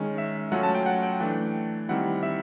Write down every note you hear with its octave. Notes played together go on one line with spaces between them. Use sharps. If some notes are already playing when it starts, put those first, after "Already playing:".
Already playing: D#3 G#3 C#4
E5
F#3 A3 C#4 F4 F#5
A5
G5
F#5
G5
E3 A3 D4 G5
D#3 G3 C4 E4 F#5
E5